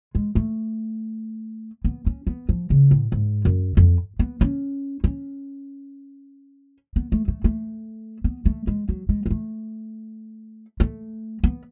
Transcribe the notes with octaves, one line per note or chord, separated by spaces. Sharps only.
G#3
A3
B3
C#4
B3
F3
C#3
A2
G#2
F#2
F2
B3
C#4
C#4
B3
A3
A3
A3
B3
A3
G#3
F#3
G#3
G#3
A3
A3
B3